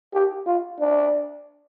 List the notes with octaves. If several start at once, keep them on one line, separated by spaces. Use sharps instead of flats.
G4
F4
D4